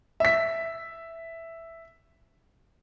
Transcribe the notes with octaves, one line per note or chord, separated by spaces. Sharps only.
E5 B6